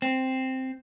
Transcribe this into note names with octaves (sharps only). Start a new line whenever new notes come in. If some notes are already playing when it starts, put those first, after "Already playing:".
C4